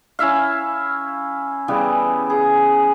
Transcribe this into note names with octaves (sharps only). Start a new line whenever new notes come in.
C#4 E4 E5 F5
C#3 E3 G3 B3
G#4